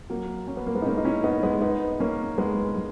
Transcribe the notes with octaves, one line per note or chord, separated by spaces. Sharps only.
F#3 A#3
C#4
B3
A#3
G#3 B3
D#4
A#3 C#4
D#4
C#4 E4
B3 D#4
G#3 B3
B3 D#4
A#3 C#4
G#3 B3
G#3